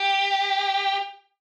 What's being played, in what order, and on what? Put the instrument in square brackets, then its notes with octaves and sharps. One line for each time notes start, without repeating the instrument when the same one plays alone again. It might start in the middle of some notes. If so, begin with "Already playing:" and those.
Already playing: [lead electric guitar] G4